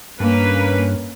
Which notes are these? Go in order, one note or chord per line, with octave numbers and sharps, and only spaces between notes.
G2 A#3 C#4 B4